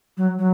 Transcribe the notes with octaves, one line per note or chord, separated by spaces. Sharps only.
F#3
F#3